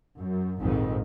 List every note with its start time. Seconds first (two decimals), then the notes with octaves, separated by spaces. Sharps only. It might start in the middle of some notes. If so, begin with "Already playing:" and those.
0.18 F#2
0.59 A#1 F2 G#2 D#3 G#3